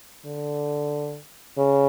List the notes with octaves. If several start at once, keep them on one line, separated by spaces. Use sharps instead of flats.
D3
C#3